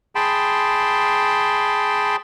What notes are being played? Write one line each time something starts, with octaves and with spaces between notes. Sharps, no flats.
G#4 G5 A5 B5 C6